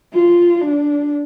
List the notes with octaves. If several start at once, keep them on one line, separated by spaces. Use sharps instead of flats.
F4
D4